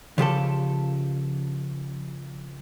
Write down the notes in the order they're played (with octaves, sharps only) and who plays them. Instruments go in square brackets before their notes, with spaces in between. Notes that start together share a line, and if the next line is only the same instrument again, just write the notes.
[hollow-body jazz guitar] C#3 F3 G4 A4